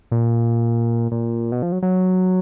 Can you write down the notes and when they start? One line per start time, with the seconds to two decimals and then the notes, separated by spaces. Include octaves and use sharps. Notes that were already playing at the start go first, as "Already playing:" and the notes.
0.12 A#2
1.12 A#2
1.52 B2
1.62 F3
1.72 F#3
1.82 F#3